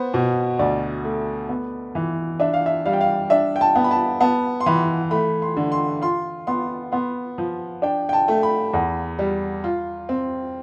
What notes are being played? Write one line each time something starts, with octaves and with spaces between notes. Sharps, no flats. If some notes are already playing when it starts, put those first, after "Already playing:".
Already playing: B3 C5
B2
D2 D5
A3
B3
E3
D4 E5
F5
E5
G3 F5
G5
F5
D4 E5
G5
A5
B3
B5
A5
B3 A5
C6
E3 B5
A3 B5
C6
D3
C6
F4 C6
B3 C6
B3 C6
F3
D4 G5
G5
A5
A3
B5
E2
G3
F4
C4